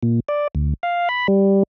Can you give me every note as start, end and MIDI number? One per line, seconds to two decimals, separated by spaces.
0.03 0.20 46
0.29 0.48 74
0.55 0.74 38
0.83 1.09 77
1.09 1.27 83
1.28 1.63 55